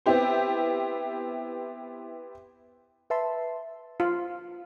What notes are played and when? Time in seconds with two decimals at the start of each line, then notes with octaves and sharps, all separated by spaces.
0.06 B3 C4 E4 G4 C5
3.10 B4 E5 A5 C6
4.00 F4